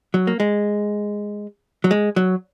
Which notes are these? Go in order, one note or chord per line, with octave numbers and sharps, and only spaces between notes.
F#3
A#3
G#3
F#3
G#3
F#3